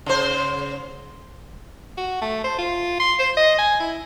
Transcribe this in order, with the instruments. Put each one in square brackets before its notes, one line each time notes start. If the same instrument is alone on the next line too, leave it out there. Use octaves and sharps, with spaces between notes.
[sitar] C#3 C5
[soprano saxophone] F#4
A3
C5
F4
C6
C5
D#5
G#5
E4